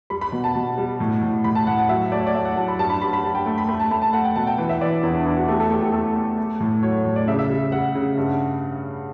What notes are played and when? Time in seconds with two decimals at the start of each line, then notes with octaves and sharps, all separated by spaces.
0.10 G3 B5
0.21 B5
0.32 B2
0.44 A5
0.55 B2
0.78 G3
1.00 A2
1.22 A2
1.44 A2 B5
1.55 A5
1.67 A2 F#5
1.79 F#5
1.89 F#3 E5
2.12 A3 D5
2.20 C#5
2.27 D5
2.34 A3 E5
2.45 F#5
2.56 F#3 A5
2.68 B5
2.79 G2 A5
2.90 B5
3.02 G2 B5
3.13 B5
3.24 G2 A5
3.35 G5
3.46 A3
3.58 B5
3.69 A3 B5
3.80 A5
3.91 A3 B5
4.02 A5
4.13 A3 F#5
4.25 G5
4.36 B2 A5
4.47 G5
4.58 E3 F#5
4.69 E5
4.81 E3 D5
5.03 E2 E4
5.14 D4
5.25 E2 E4
5.37 F#4
5.48 A3 G4
5.60 A4
5.70 A3 G4
5.81 G4
5.92 A3 A4
6.15 A3
6.38 A3
6.60 A2
6.83 F#3 C#5
7.05 A2
7.16 D5
7.28 C#3 E5
7.39 E5
7.49 G3
7.72 G3 F#5
7.95 C#3
8.17 G2